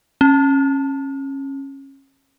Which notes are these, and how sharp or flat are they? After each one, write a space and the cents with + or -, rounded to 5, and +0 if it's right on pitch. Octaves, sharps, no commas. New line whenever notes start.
C#4 -20